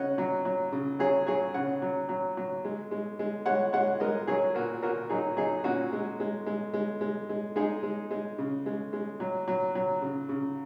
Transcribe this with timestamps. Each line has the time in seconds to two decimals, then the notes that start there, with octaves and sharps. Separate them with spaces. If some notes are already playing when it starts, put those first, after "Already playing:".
Already playing: C#3 C#5 D#5 F#5
0.18 F#3
0.45 F#3
0.72 C#3
0.99 F#3 G#4 C#5
1.27 F#3 G#4 C#5
1.54 C#3 C#5 F#5
1.82 F#3
2.09 F#3
2.37 F#3
2.65 G#3
2.91 G#3
3.19 G#3
3.46 G#3 C#5 F#5
3.73 G#3 C#5 F#5
4.00 G#3 A#4 D#5
4.27 F#3 G#4 C#5
4.55 A#2 F#4 A#4
4.82 A#2 F#4 A#4
5.09 F#3 D#4 G#4
5.37 F#3 D#4 G#4
5.64 A#2 C#4 F#4
5.93 G#3
6.20 G#3
6.46 G#3
6.73 G#3
7.01 G#3
7.29 G#3
7.56 G#3 D#4 G#4
7.83 G#3
8.11 G#3
8.38 C#3
8.66 G#3
8.93 G#3
9.20 F#3
9.48 F#3
9.75 F#3
10.02 C#3
10.29 C#3